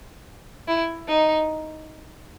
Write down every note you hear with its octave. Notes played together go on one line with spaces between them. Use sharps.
E4
D#4